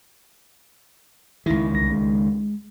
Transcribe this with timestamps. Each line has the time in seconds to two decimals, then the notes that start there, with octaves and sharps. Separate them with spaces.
1.46 C#2 D#3 E4
1.73 C2 C#3 A#6
1.92 G#3